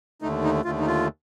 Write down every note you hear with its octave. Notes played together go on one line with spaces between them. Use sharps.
D#2 D3 A3 D#4
D#4
D#2 D3 A3 F4
D#4
F4